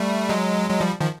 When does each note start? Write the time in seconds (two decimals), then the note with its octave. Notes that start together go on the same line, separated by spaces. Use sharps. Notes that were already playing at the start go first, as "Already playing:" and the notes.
Already playing: G3 A3
0.29 F#3 G#3
0.70 F#3 G#3
0.81 F3 G3
1.00 D#3 F3